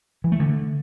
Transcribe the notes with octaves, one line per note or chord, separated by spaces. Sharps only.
E3
A3
D3